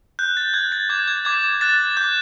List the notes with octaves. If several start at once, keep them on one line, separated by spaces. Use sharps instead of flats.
F#6 G6
A6
F#6 G#6
A6
D6 G#6
G#6
D6 G#6
F#6 A6
D6 G6